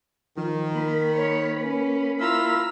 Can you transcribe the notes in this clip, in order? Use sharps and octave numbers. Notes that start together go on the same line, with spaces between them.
D#3 F3
A#3 B5
C#5
C#4 B4
E4 F4 A#5 E6